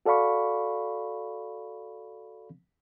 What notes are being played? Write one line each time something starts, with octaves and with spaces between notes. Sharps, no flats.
F#4 A4 D5 F5 B5 C#6